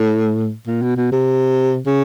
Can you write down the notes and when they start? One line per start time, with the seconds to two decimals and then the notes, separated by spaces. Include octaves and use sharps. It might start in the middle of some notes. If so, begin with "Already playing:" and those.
Already playing: A2
0.67 A#2
0.82 B2
0.97 B2
1.12 C3
1.86 C#3